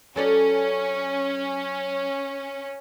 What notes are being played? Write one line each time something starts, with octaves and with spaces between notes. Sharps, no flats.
F#3 C#4 A4 D5